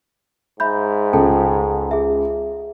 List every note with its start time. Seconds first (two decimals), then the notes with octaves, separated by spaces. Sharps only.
0.60 G#2 E5 B5 G6
1.13 C#2 A4 G5 A5
1.91 G#4 E5